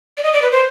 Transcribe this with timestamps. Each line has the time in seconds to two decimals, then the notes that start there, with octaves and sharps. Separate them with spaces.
0.18 D5
0.23 D#5
0.33 D5
0.42 B4
0.52 C5